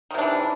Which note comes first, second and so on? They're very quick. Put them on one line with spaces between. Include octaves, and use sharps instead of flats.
D#3 C3 D4 E3